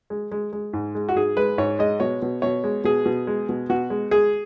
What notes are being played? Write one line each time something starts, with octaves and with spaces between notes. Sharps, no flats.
G#3
G#3
G#3
G#2
G#3
F#4
G#2 G#4
G#3 B4
G#2 C#5
G#3 D#5
B2 C#5
B2
B2 C#5
G#3
B2 G#4
B2
G#3
B2
B2 F#4
G#3
G#3 G#4